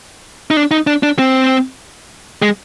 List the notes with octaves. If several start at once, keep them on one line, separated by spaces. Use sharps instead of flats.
D#4
D4
D#4
D4
D4
C4
G#3